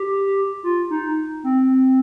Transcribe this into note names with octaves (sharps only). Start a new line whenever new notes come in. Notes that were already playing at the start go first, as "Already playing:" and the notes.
Already playing: G4
F4
D#4
C4